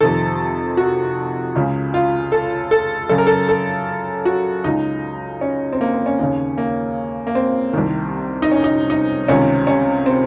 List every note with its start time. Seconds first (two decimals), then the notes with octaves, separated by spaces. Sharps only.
0.01 F2 C3 D#3 A4
0.77 F#4
1.55 C#2 C#3
1.94 F4
2.32 A4
2.71 A4
3.09 F#2 C#3 A4
3.18 A#4
3.27 A4
3.49 A4
4.25 F#4
4.64 C#2 C#3 D#4
5.41 C#4
5.72 C4
5.81 A#3
5.94 C4
6.06 C#4
6.19 D#2 C#3
6.58 A#3
7.27 A#3
7.35 C4
7.73 C2 C3 D#3
8.42 D#4
8.51 C#4
8.64 D#4
8.90 D#4
9.28 C#2 C3 D#3 C#4
9.67 C#4
10.06 C4